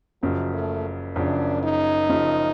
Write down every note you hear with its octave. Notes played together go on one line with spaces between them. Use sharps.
F#1 F#2 C#3 F3 F#3
A3
F#1 F#2 C#3 F3 D4
D#4
F#1 F#2 C#3 F3